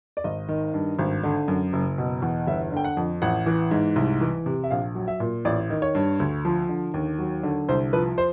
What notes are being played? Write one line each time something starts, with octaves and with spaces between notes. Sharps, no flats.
D5
G#1 D#5
D#3
G2
G#1
D3
F#2
F#1
B2
E2
G1 E5
D3 G5
F#5
F2
A1 F#5
E3
G#2
C2
E3
C3
E5
A#1 F5
F#3
E5
A#2
A1 D5
D#3
C#5
G2
D2
F3
D3
D#2
F#3
D3
C2 C5
F3 B4
C5